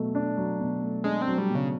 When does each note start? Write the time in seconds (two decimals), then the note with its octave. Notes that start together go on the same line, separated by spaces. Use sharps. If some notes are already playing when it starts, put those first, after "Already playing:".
Already playing: B2 F#3 A3
0.15 D4
0.37 F#3
0.60 B2
0.82 A3
1.04 G#3 D4
1.22 C4
1.27 F#3
1.38 G3
1.50 B2
1.55 C#3